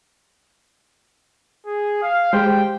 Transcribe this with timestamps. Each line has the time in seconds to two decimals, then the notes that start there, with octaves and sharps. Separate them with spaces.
1.67 G#4
2.02 F5
2.33 G#3 G4 C5 G5